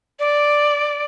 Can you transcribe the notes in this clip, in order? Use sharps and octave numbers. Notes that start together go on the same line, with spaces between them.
D5